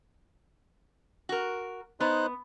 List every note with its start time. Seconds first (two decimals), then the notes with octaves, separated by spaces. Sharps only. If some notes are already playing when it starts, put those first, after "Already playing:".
1.29 F#4 A#4
2.00 B3 D#4 C5 F#6